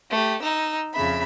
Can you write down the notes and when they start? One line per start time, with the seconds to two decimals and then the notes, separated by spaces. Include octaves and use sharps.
0.10 A3 G4
0.42 D#4 E6
0.94 F2 C#3 E5 B5